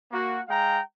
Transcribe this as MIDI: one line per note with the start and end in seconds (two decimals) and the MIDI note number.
0.11 0.40 58
0.11 0.40 66
0.48 0.79 56
0.48 0.79 77
0.48 0.79 79
0.48 0.79 82